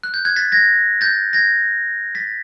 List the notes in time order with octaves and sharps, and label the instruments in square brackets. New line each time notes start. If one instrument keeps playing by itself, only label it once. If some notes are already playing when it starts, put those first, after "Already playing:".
[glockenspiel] F#6
G6
F#6 G#6
A6 B6
G#6 A#6
G6 A6
G#6 A#6
A6 B6